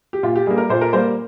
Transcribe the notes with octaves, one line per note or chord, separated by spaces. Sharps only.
G4
A#2 F4
G4
G3 A#3 G#4
A#4
A#2 C5
A#4
G3 A#3 C5